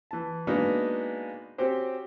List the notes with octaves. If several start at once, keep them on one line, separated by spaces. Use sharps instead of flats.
E3 A5
G#3 A#3 B3 D4 D#4 F#4
C4 C#4 F#4 G4 C5